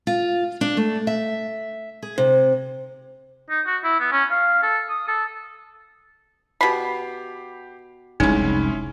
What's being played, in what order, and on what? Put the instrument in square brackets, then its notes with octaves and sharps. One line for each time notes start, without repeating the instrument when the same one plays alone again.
[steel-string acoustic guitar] F4
D4
A3
E5
G#4
C3
[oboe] D#4
F#4
E4
B3
C#4
F5
A4
D#6
A4
[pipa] B2 B5 [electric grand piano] G4 C7
[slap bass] F1 C2 [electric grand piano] G#3 C#4 E4 [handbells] D#4